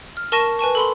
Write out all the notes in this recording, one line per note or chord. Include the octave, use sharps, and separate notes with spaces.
F6
A#4 A5 C#6 A#6 D#7 E7
B4 G#5 A5 C#6
A4 B5 C6